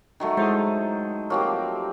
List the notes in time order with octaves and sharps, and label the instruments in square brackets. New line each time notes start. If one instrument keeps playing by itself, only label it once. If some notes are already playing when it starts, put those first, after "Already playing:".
[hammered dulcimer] D#3 F#3 A3
[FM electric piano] G#3 E4 [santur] C5 D#6
[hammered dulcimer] F3 C4 G4 [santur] F#3 A#3 F#4